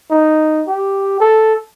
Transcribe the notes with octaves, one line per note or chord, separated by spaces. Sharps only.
D#4
G4
A4